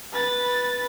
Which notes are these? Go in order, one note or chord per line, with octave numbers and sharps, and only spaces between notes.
B4 A6